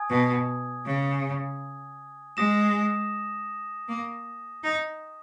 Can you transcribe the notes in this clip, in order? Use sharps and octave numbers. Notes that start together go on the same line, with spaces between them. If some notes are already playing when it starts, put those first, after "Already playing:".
Already playing: G#5 D#6 G#6
B2
C#3
G#3 D#6 A#6 E7
A#3
D#4